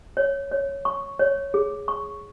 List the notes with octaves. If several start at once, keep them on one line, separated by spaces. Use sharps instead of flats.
C#5
C#5
C#6
C#5
G#4
C#6